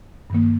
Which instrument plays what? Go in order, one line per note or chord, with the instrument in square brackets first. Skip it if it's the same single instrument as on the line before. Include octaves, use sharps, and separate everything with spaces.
[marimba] G2 D#3 A#3